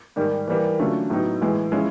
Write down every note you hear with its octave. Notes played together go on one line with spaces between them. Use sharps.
G#2 D#3 G3 A#3
E3 G3 A#3
D3 F#3 A3 C#4 F4
A2 F#3 B3 D#4
A2 E3 G#3
F3 G#3 C#4 E4